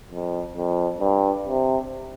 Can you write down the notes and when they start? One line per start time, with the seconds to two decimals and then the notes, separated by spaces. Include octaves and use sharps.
0.11 F2
0.56 F2
1.00 G2
1.46 C3